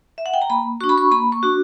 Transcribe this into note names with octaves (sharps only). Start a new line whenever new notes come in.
E5
F#5
G5
A#5
A#3 B5
D4 F#4 C#6
B5
C#6
A#3 B5
C#6
D4 F#4